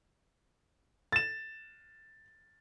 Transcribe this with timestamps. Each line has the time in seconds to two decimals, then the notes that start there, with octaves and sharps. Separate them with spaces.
1.12 A6 E7